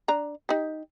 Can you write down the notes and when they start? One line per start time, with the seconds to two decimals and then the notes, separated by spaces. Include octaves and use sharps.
0.08 D4 A#5
0.49 D#4 G4